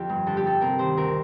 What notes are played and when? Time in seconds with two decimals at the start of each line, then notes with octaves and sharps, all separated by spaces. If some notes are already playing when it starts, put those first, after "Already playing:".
Already playing: F2 D3 F4 G4
0.09 G2
0.27 D3 A4
0.37 G4
0.44 G2 A4
0.61 C3 A#4
0.79 D#3 C5
0.97 D2 A#4